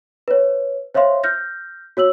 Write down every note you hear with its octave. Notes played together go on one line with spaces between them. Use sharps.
B4 C#5
C5 C#5 E5 F5 C6
F6 G6 A#6
F#4 C#5 E6 F#7